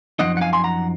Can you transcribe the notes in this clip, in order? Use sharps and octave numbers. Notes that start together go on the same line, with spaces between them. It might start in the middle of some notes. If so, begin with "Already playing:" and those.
F#2 F3 C4 D#4 D#5 F#5
F#5
F5 G#5
G#5 C6
F#5 A#5